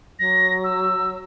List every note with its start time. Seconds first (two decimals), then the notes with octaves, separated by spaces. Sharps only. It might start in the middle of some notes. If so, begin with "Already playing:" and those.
0.19 F#3 A#6
0.64 E6